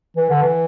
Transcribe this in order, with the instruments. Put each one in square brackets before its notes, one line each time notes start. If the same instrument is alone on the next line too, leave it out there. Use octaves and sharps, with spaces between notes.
[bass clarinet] E3
D3
E3